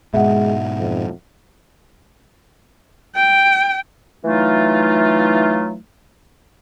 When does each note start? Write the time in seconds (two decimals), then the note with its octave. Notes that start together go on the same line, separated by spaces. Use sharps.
0.14 G#2 B2 G#3 E5 F#5
0.79 F2
3.16 G5
4.24 E3 F#3 A3 D#4 F4